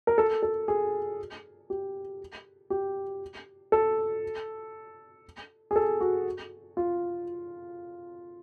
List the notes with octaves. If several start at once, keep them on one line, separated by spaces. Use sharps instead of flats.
A#4
A4
A4
G#4
G4
G4
A4
G#4
A4
F#4
F4